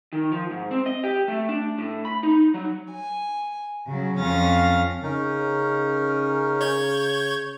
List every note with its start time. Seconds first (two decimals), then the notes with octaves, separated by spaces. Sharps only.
0.13 D#3
0.32 F3
0.51 G#2
0.71 C4
0.86 D#5
1.04 G4
1.28 A3
1.49 D4
1.78 A2
2.05 B5
2.23 D#4
2.54 F#3
2.93 G#5
3.87 C#3 F#3
4.20 F2 C#4 F5 F6 A6 A#6
5.03 C#3 C#4 D#4 A#4
6.61 C#5 G6 G#6